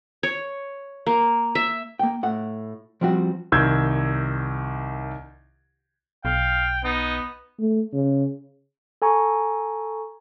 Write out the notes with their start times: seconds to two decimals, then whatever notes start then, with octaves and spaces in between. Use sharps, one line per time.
0.23 C#5
1.07 A#3
1.55 E5
1.99 A#3 G5
2.23 A2 F#5
3.01 F3 G3 C4 F#4
3.52 C2 D#3 E6 G6 G#6
6.25 B1 F5 G5
6.84 B3 D#4
7.59 A3
7.93 C#3
9.02 A4 G#5 A#5 C#6